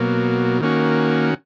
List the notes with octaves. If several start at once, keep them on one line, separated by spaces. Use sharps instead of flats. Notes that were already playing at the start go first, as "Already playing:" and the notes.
Already playing: B2 F#3 A#3
D#3 A#3 C#4 F#4